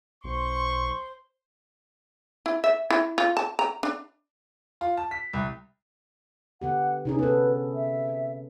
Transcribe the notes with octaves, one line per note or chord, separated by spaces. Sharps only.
B1 C5 C6 C#6
E4
E5
E4
F4
A5
A#5
D4
F4
A5
B6
C2
D3 B3 G4 F#5
C3 C#4 D#4 G#4
B3 A4 B4
E5